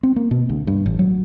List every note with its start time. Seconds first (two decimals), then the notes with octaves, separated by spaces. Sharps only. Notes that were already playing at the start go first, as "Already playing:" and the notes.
0.03 C4
0.16 A#3
0.31 B2
0.49 D2
0.67 G2
0.86 A1
0.99 F#3